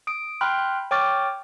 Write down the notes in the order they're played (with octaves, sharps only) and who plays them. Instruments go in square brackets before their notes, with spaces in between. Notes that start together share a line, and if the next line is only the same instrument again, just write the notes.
[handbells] D#6 D7
G5 B5 C6 F6 F#6
C#5 G5 C#6 D6 F6 A6